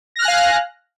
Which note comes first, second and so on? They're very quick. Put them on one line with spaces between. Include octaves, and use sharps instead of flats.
A#6 F6 F#6 G#5 F5